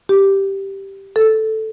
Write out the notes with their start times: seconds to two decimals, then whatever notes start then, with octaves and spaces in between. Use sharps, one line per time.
0.09 G4
1.16 A4